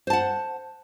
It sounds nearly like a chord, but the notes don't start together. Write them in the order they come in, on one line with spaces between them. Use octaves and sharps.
C5 A5 F#5